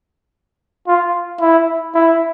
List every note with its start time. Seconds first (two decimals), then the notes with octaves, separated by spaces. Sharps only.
0.88 F4
1.40 E4
1.95 E4